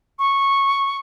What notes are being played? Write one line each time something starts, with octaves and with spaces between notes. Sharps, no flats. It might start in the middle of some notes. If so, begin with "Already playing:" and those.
C#6